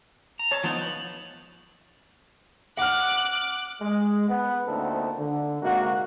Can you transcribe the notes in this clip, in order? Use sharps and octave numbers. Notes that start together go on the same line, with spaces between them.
A#5
C#5 A5
F3 B3 D#4 A5
B5
F#5 D6 F6 F#6
G#3
B3
D2 A#2 C4 D#4 A4
D3
G#2 C3 A#3 F#4